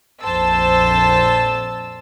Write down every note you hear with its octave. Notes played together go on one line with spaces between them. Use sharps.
A#1 F2 C5 A5 E6